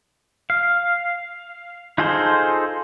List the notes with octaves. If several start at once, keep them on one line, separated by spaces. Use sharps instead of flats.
F5
D#4 F4 G#4 A4 C5